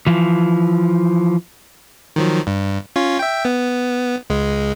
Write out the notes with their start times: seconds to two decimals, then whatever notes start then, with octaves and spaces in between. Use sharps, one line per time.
0.07 E3 F3
2.16 D#3 F3 F#3
2.47 G2
2.96 C#4 F4 C#5
3.19 E5 G5
3.45 B3
4.30 C#2 G#3